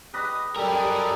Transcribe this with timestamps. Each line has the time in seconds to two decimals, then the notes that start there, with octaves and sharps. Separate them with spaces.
0.14 G4 B4 D#5 D#6
0.56 F#3 G3 G4 A4 A#4 D5 G#5 D#6